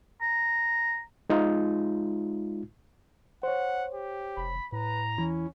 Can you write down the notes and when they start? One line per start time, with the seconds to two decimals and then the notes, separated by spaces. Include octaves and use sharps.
0.21 A#5
1.30 G#3 D#4 F4
3.43 C5 C#5 F#5
3.94 G4
4.37 F1 B5
4.72 A2 B4 A#5
5.18 E2 E3 C#4 E4